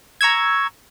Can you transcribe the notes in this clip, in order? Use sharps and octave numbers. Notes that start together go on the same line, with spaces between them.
A#5 C#6 E6 G#6